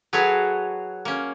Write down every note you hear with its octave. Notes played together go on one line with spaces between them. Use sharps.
F#3 F#4 G#4 A4 B4 C#5
A#3 C#4